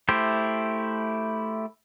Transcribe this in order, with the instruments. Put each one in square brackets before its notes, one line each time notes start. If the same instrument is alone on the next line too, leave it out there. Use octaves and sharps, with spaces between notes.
[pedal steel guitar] A3 E4 G4 C5